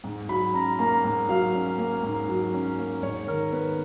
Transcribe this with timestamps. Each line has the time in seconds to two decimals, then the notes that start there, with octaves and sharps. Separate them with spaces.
0.04 G#2
0.29 F#3 B5
0.54 C#4 A#5
0.79 A#3 A#5
1.04 G#2
1.29 F#3 F5
1.54 C#4
1.78 A#3
2.03 G#2
2.29 F#3
2.54 C#4
2.78 A#3
3.03 G#2 C#5
3.27 D#3 A#4
3.52 B3 B4